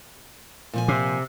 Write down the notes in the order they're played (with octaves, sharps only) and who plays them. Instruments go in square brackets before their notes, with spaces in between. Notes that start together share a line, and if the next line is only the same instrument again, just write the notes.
[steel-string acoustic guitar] A#2 F3 G#5
[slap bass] C3